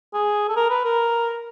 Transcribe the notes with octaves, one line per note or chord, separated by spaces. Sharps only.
G#4
A4
A#4
B4
A#4